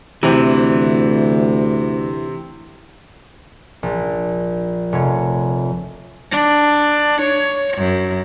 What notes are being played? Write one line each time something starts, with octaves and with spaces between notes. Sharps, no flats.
D2 C3 E3 C4
A#1
F1 C#5
D4
C#5
F#2